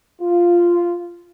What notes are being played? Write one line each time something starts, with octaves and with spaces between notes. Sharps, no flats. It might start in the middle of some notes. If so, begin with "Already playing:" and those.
F4